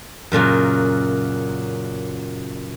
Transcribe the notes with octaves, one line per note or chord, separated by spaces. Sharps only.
F#2 A#2 C#3 F#3